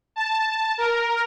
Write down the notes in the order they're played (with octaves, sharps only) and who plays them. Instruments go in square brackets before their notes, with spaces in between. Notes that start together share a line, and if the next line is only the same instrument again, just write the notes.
[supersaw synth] A5
A#4